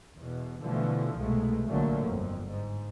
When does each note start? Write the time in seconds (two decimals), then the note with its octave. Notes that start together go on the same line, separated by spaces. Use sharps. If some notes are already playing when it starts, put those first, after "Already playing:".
0.17 E2 B2
0.62 B2 D3 E3 F3 G3 A3
1.18 C2 G#2 B2 G#3 A3
1.68 A#1 D3 F3 F#3 A3 A#3
2.06 G1 F2
2.47 G#2